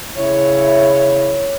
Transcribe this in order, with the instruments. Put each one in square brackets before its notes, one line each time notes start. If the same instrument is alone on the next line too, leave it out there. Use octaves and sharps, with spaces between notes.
[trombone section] C#3 E4 [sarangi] C#5